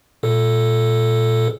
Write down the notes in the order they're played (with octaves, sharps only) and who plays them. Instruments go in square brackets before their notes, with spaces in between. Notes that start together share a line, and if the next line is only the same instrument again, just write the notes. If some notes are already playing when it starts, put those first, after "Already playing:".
[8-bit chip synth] A#2 A4